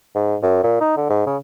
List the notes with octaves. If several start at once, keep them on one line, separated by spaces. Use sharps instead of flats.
G#2
F#2
A#2
D#4
D3
G#2
C#3